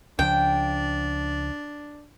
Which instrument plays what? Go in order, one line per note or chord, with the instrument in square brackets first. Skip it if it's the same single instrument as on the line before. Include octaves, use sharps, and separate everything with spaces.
[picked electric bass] C#2 C#3 F3 [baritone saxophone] D4 [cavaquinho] G5